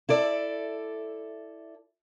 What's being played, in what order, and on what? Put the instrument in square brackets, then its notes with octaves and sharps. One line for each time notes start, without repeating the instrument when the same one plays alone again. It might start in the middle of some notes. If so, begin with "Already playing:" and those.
[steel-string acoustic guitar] E4 A4 D5